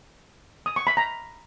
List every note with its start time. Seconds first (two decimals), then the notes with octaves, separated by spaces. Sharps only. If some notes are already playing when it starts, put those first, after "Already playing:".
0.66 D#6
0.76 C#6
0.87 B5
0.97 A#5